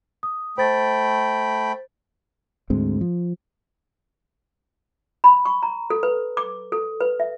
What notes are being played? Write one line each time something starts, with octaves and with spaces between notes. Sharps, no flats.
D#6
A3 C5 G5 B5 A6
D2 G#2 G#3 C4
F3
B5
C#6
A#5
A4
B4
D6
A4
B4
E5